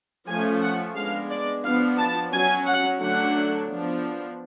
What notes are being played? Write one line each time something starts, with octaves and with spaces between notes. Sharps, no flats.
F3 A3 C#4 G#5
F#5
G#3 B3 D4 F5
D5
F3 B3 D4 F5
A5
F#3 C#4 G#5
F#5
D3 F#3 A3 D4 F#5
F3 B3 D4